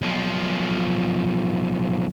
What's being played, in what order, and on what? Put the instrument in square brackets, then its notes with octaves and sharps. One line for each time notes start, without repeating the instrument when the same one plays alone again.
[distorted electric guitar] B1 F3